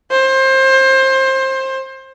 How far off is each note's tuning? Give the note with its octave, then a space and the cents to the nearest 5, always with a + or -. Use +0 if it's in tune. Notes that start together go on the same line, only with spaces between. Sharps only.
C5 +25